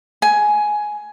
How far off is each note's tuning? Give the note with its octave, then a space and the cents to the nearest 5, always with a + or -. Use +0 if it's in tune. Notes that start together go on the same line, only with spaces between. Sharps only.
G#5 +10